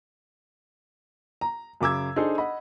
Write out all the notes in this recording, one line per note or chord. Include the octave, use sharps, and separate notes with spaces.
A#5
F#2 C#3 D6 E6 G#6
D4 D#4 G#4 A4 C5
D#5 F#5 B5